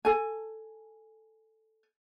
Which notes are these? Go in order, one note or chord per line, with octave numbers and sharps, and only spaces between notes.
A4 G#5